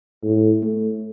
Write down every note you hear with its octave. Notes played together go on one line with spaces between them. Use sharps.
A2
A3